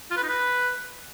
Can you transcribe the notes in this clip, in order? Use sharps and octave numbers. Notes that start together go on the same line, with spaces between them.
F4
B4
D#4
B4